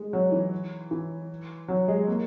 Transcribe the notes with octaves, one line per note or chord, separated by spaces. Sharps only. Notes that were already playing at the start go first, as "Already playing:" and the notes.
Already playing: G#3
F#3
E3
E3
F#3
G#3
A#3